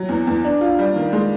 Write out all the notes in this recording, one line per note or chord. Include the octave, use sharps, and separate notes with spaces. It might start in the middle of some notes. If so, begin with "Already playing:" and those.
Already playing: F#3
E2
E2
D4
F4
G3
D#3
G#3